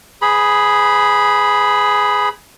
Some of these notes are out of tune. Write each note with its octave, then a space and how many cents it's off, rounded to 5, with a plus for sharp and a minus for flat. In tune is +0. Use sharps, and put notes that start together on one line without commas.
G#4 +0 B4 +40 B5 -10